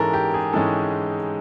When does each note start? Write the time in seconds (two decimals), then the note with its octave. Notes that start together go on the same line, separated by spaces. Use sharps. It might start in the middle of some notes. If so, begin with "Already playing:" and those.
Already playing: G#2 E3 G#3 C#4 A4 A#4
0.13 G4
0.34 G#4
0.53 G#2 E3 G#3 C#4 A4